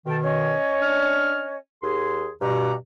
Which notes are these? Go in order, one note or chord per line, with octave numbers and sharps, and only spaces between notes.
B2 D#3 A4 G5
C#4 C#5 D#5
D4 F6
D#2 G#4 C6
G2 B2 G4 F#5 A#5